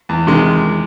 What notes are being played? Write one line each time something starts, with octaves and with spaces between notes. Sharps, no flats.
E2
C3 D#3 G#3